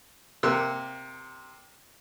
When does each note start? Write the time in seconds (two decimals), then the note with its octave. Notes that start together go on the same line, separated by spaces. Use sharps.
0.43 C3 A#3 E6 F#6